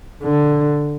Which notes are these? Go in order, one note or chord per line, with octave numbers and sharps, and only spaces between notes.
D3